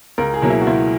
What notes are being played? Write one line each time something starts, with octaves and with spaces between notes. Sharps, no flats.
C#2 A#4
G#4
B2 F#3 A#3
E4
F#4
C#2 E4